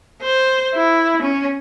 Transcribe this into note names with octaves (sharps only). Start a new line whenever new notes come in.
C5
E4
C#4